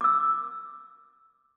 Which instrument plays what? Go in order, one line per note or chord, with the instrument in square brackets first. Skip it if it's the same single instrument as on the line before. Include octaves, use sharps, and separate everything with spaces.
[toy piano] D6 E6